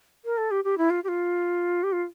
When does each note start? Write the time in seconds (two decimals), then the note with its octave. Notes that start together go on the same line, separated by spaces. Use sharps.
0.25 A#4
0.37 A4
0.51 G4
0.64 G4
0.78 E4
0.90 F4
1.04 G4
1.08 F4
1.83 G4
1.92 F4